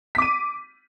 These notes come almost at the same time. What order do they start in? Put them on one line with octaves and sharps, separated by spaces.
B6 D6 D#7